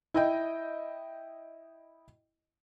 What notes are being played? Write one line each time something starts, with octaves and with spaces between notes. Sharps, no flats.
E4 D#5 G5